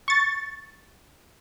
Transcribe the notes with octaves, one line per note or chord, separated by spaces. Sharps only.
C#6 A6